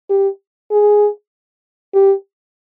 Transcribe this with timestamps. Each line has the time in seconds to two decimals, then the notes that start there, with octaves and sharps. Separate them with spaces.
0.10 G4
0.71 G#4
1.94 G4